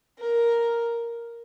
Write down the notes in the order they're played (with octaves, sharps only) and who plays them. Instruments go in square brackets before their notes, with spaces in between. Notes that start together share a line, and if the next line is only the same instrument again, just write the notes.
[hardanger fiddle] A#4